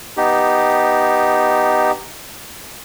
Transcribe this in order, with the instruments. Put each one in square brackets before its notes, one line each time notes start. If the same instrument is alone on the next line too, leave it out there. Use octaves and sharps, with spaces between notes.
[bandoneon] B3 D#4 G4